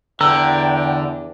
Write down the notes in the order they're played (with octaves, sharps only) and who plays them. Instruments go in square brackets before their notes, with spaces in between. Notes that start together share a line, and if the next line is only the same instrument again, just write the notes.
[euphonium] E2 [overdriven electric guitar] D3 [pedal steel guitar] A4 A#5 E6 [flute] G5